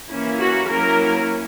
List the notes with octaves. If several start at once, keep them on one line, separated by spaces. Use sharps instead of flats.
E3 A#3 C#4 E4
F#4
F#3 A#3 C#4 E4 A#4